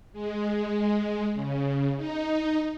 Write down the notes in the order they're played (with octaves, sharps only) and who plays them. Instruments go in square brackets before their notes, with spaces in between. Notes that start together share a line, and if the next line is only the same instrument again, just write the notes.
[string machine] G#3
C#3
D#4